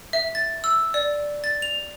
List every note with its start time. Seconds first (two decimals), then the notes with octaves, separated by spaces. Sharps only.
0.13 E5
0.35 A6
0.64 E6
0.94 D5
1.44 A6
1.62 F7